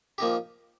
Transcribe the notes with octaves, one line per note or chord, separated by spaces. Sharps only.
F3 A#3 D#4 G4